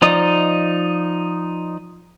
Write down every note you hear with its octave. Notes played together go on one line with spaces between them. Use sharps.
F3 D#4 D5 D#5 D#6